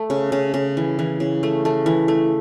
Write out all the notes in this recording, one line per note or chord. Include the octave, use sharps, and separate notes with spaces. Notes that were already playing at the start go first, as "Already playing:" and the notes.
Already playing: A3
C#3
C#3
C#3
E3
E3
C#3
A3
A3
E3
A3